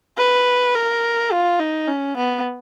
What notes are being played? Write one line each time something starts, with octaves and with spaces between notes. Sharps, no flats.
B4
A#4
F4
D#4
C#4
B3